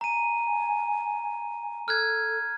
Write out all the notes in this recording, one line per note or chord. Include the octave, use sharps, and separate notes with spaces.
G#5 A#5 D#7
A4 F6 F#6 G#6